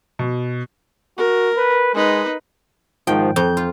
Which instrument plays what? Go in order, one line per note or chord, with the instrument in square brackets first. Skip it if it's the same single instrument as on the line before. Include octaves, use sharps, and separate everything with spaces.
[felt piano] B2
[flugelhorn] F#4 [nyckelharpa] A#4
[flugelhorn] B4
[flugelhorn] G#3 [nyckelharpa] D#4 B4
[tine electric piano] G#2 D#3 F3 [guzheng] G5
[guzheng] F2 [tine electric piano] G6
[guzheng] F4